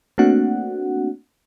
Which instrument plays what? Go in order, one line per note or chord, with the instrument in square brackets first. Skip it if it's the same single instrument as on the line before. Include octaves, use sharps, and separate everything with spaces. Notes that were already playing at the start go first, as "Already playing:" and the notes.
[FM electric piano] A3 A#3 C4 D4 F#4 F#5